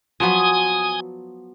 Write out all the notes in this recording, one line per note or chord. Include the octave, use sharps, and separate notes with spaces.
F3 F#3 B3 G#5 D#6